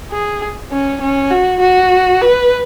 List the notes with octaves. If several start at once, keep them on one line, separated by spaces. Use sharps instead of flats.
G#4
C#4
C#4
F#4
F#4
B4